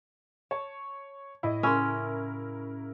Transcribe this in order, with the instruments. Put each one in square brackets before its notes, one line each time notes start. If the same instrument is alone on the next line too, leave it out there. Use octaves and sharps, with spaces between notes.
[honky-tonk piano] C#5 [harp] A5
[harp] A2 [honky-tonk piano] E4 D#5
[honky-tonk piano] C#3 E4 A#4 [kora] C#4 [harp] C6 E6